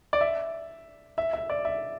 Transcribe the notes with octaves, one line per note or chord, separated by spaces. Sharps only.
D5
E5
E5
E5
D5
E5